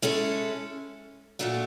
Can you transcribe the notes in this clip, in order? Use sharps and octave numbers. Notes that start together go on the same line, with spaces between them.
G#3 C#4 E4 A4
A#2 F#3 A3 D4